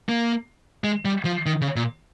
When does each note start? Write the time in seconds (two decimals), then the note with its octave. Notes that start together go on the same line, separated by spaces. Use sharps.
0.09 A#3
0.84 G#3
1.05 G3
1.25 F3
1.46 D#3
1.61 C#3
1.76 A#2